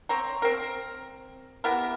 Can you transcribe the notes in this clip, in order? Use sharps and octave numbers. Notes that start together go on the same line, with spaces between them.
C4 C#5 A#5
C4 A#4
B3 E4 G4 A#4